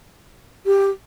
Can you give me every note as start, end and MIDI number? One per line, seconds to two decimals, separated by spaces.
0.66 0.90 67